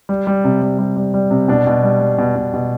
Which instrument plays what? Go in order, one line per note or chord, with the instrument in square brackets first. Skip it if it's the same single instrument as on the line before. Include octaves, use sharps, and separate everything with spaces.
[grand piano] G3
G3
C3
G3
G3
G3
G3
C3
B2 D4
B2
G3
G3
B2
B2
B2